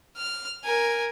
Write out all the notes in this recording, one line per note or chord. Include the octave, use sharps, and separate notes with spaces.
F6
A#4 G#5